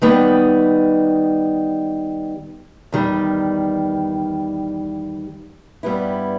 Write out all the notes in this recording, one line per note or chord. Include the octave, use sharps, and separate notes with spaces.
D#3 G3 B3 D#4
E2 D#3 G3
G2 G3 B3 E4